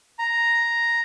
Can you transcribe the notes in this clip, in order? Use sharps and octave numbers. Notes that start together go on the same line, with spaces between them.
A#5